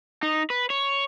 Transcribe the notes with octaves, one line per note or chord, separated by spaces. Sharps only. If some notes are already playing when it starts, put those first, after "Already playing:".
D#4
B4
C#5